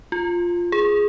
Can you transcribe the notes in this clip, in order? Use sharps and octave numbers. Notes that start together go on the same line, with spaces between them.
F4
G#4